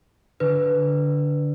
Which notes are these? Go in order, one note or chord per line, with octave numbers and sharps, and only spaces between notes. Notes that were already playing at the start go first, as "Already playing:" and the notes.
D3 B4